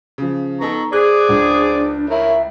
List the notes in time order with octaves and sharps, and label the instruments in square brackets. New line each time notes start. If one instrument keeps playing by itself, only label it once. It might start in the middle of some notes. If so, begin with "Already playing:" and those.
[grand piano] C#3 F3
[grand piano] B3 D#4 A4 [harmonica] A#5 C#6
[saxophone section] G#4 [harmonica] C5 D5 [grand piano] F#6
[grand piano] C#2 [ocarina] D4
[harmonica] E4 A#4 C#5 [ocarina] E5